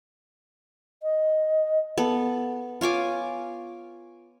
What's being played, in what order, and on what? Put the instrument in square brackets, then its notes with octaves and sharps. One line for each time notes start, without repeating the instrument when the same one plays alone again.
[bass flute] D#5
[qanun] B3 A4
F4 C#5 G#5 D6